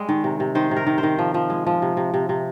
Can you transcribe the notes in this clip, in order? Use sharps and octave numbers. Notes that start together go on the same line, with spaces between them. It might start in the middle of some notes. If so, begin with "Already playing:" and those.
Already playing: G3 G#3
D#3
C3
C3
D#3 C5
C3
A#4
D#3
C5
D#3
F3
F3
G#3
F3
C3
C3
C3
C3